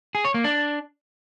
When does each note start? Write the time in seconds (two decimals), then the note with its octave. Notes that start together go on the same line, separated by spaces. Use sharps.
0.15 G#4
0.25 C#5
0.34 A#3
0.44 D4